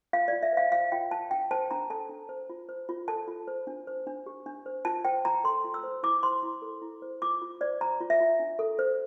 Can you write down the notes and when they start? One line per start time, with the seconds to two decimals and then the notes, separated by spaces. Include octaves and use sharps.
0.13 F4 F5
0.28 F4 D5
0.43 E5
0.53 C5 F5
0.72 C5 F5
0.92 F4 G5
1.11 F4 A5
1.31 D4 G5
1.51 C5 A5
1.71 D4 A#5
1.90 A4 A5
2.09 D4
2.29 C5
2.49 F4
2.69 C5
2.89 F4
3.08 A4 A5
3.28 F4
3.48 C5
3.67 D4
3.87 C5
4.07 D4
4.26 G4
4.46 D4
4.66 C5
4.85 F4 A5
5.05 C5 G5
5.25 F4 A#5
5.44 A4 C6
5.64 F4
5.74 E6
5.84 C5
6.03 E4 D6
6.23 C5 C6
6.43 E4
6.62 A4
6.82 E4
7.02 C5
7.22 F4 D6
7.42 F4
7.61 C5 D5
7.81 C5 A#5
8.00 F4
8.10 E5
8.21 F4
8.40 D4
8.59 A4
8.79 C5